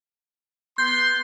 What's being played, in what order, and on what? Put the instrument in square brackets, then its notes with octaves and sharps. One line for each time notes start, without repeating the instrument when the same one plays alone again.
[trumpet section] B3 C6 [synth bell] G6